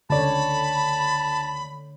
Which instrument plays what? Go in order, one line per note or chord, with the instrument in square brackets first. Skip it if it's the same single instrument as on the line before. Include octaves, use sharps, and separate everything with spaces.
[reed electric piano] C#2 D5 [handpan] D3 C#5 [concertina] A5 [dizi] B5